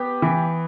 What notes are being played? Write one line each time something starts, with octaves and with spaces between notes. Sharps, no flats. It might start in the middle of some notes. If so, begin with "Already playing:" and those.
Already playing: B3 G4
E3